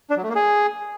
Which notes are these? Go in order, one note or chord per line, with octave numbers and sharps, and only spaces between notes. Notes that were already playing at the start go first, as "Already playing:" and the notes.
D4
F#3
A3
A#3
G#4